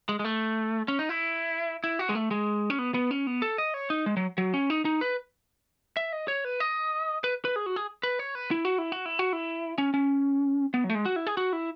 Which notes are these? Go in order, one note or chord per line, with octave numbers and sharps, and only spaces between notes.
G#3
G#3
A3
C#4
D#4
E4
E4
F#4
G#3
A3
G#3
C#4
B3
B3
C#4
B3
A4
D#5
C#5
D#4
G#3
F#3
F#3
C#4
D#4
D#4
B4
E5
D#5
C#5
B4
D#5
B4
B4
G#4
F#4
G#4
B4
C#5
B4
E4
F#4
E4
F#4
E4
F#4
E4
C#4
C#4
B3
F#3
A3
G#3
F#4
E4
G#4
F#4
E4